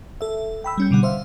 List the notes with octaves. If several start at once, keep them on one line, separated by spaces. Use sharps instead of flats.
A4 E5
G5 B5 E6
G3 C#4 G6
B2 D3 G3 F#5
C5 E5 F5